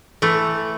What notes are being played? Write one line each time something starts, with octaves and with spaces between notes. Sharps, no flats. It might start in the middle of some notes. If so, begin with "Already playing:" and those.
E3 A3